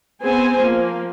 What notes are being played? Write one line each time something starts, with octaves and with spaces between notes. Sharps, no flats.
B3 C4 G#4 C5 G#5
F3 A#3